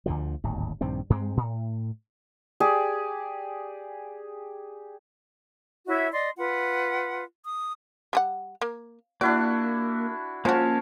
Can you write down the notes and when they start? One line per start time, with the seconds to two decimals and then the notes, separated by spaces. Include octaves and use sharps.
0.06 D2 D3 F3
0.44 D1 G#1 D#2
0.81 A#1 G2 D#3 C4
1.10 G2 G#3 C4
1.37 A2
2.60 G4 G#4 D5
5.87 E4 F#4 C#5 E5
6.13 D5 D#5 C6
6.37 F4 B4 F#5
7.46 D#6
8.13 G3 G#4 F#5
8.61 A#3
9.21 A#3 D4 E4 F#4 D5
10.45 F3 G#3 A#3 C#4 F#4 C#5 F5 A5